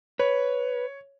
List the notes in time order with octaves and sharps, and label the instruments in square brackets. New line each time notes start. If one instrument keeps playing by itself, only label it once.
[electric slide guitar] B4 [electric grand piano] C#5